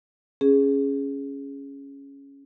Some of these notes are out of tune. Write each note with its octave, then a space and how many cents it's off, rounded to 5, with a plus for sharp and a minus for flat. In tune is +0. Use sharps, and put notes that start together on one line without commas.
C#4 +0 G#4 +0